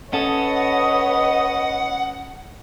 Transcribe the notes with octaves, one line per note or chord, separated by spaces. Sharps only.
C#4 A4 B4 C#5 D#5 F#5